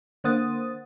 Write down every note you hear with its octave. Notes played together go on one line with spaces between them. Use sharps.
D3 A#3 C5 F#5 D#6 A6